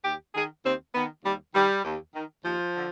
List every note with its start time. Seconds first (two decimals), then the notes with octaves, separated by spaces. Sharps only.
0.04 D#2 G4
0.35 D#3 G#4
0.65 D#2 C4
0.95 D#3 B3
1.25 D#2 G3
1.55 D#3 G3
1.85 D#2
2.14 D#3
2.45 D#2 F3
2.75 D3